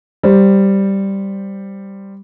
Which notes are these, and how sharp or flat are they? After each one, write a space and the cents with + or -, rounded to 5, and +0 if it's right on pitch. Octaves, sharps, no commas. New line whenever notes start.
G3 +0 C5 +0